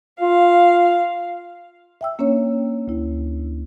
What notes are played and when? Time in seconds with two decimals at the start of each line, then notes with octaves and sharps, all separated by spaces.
0.21 F4 F5
2.01 E5 G5 E6
2.19 A#3 C#4 D4 C#5
2.88 D2 E4